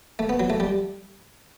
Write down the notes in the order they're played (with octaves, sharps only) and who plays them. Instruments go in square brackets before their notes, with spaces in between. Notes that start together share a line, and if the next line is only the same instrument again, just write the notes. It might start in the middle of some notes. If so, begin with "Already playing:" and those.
[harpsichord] A3
B3
F#3
A3
G3